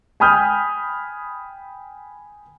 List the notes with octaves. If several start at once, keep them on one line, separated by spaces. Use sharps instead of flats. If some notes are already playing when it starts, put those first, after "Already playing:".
G5 G#5 B5 D#6 F6 G6